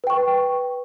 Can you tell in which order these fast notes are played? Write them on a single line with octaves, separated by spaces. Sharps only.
B4 G5 C#6